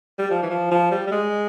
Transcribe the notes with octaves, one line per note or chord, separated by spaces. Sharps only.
G3
F3
E3
F3
F3
G3
G3
G#3